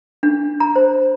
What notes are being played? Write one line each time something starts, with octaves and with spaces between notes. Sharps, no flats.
D4
A#5
C5